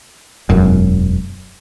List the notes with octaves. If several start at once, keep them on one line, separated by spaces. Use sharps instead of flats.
E1 F#2